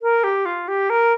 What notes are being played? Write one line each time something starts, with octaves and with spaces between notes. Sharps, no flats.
A#4
G4
F4
G4
A#4